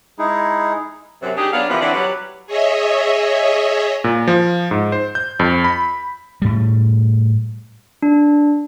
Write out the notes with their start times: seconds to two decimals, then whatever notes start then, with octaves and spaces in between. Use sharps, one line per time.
0.19 G#3 D#4 E4 G#4
1.22 F#2 C3 F#3
1.37 D4 D#4 G4 G#4
1.53 F#3 B3 D4 F5
1.70 C3 E3 F3 G3 A#3 B3
1.81 D3 E3 C4 E4 C#5 D5
1.94 F#3 G3 B4
2.46 G#4 C#5 D#5 E5
4.04 A#2
4.27 F3
4.71 G#2
4.92 C5
5.15 G6
5.40 F2
5.64 B5
6.42 A2 G3
8.02 D4